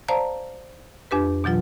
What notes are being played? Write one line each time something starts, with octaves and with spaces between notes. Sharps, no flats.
C5 D5 F5 A5 A#5
F2 D4 G4 B4
B2 E3 F#3 F4